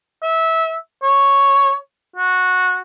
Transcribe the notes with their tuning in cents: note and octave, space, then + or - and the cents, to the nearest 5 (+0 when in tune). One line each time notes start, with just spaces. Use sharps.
E5 -20
C#5 +0
F#4 -15